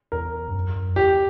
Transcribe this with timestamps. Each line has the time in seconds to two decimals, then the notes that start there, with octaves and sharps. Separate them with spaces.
0.12 E2 A#4
0.48 G2
0.54 F#2
0.76 F#2
0.96 E2 G4